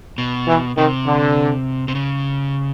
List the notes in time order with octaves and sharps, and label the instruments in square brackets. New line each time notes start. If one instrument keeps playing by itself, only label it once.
[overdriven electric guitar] B2
[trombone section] E3
[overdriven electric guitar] C3 [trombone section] D#3
[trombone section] D3
[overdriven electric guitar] C3
C#3